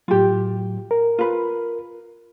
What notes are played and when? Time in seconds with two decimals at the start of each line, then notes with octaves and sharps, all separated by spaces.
0.08 A2 F#3 F4 G4
0.91 A#4
1.19 F4 B4